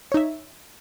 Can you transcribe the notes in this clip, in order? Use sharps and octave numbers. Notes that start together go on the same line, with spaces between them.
D#4 C#5 E5